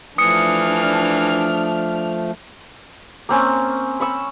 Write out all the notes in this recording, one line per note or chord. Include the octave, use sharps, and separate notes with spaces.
E3 F3 A3 D4 D#6 F6 C#7
A#3 C4 C#4
B5 C#6 E6